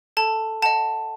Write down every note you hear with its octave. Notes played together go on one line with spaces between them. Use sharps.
A4 A5
D#5 F#5 A5